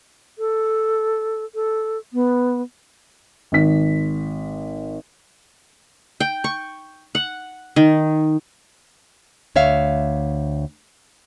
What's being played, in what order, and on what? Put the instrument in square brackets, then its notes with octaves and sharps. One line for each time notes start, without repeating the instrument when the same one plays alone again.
[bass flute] A4
A4
B3
[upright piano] G#1 B6
[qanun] G5
C#6
F#5
D#3
[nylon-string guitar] D2 C#5 E5 F5